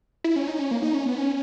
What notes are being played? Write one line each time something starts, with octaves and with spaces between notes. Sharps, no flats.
E4
C#4
D#4
C#4
A#3
D#4
C#4
B3
C#4